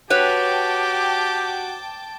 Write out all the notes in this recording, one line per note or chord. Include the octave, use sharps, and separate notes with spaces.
F#4 G4 B4 C#5 G5 A5 D6